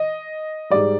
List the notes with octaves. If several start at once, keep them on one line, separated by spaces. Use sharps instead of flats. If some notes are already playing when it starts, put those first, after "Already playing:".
Already playing: D#5
G#2 G3 D5